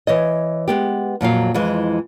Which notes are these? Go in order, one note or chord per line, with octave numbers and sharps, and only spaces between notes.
E3 C#5 D#5
G#3 B3 G4
F2 A#2 F#3 F5
F2 E3 G#3